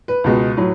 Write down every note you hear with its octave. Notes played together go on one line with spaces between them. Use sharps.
B4
C#2 B2 G#3
A2 F#3